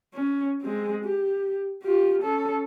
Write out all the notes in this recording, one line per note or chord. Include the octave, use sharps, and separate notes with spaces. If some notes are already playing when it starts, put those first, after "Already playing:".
C#4
G#3 C4
G4
F4 G4
C#4 A4